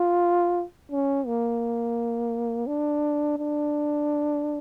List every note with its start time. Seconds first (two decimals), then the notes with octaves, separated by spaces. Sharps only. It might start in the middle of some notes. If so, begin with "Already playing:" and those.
Already playing: F4
0.91 C#4
1.27 A#3
2.67 D4
3.38 D4